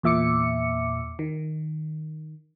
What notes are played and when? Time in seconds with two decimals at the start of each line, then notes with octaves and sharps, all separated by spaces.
0.03 E2 A#2 E5 D6 C#7
1.19 D#3